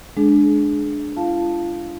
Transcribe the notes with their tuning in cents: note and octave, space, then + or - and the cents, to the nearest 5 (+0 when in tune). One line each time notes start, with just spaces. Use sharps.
G#3 +10 D4 +0 G#4 +25
F4 -35 F5 +0 A5 +0